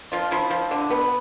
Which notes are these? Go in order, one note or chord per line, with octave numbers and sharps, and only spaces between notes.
F3 F4
F3 E4
F3
D3
B3